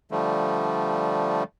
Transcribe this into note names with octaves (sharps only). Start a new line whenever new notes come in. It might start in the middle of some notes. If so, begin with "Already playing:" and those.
D3 F3 G3 A3